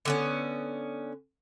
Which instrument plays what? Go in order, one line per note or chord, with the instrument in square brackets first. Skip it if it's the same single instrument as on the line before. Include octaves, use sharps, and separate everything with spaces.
[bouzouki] D3 B3 C#4